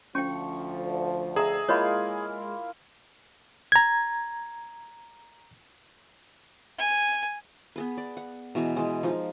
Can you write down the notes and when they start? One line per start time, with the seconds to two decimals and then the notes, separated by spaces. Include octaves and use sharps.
0.15 D2 F3 C#4 G5 C#6
1.36 G#4 D#5 E5 A#5 E6
1.69 G#3 A#3 E4 F4 C#5 D#5 B5
3.72 A#5 G#6
6.78 G#5
7.76 B3 G#4 B4
7.97 D5
8.17 F#5
8.55 B2 E3 G#3 A#5
8.76 E3 G#3
9.03 F3 D#4